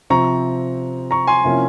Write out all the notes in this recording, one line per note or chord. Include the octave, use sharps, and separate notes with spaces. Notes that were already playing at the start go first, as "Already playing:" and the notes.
C3 F3 C4 A#5 C#6
A#5 C#6
G#5 C6
C3 F3 A#3 C#4 E4